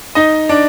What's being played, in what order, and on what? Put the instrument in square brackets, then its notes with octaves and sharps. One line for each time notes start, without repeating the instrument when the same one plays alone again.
[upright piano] D#4 D#5
D4 D5